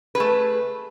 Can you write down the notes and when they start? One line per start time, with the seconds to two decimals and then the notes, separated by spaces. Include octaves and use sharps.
0.15 B4
0.17 G#4
0.20 A3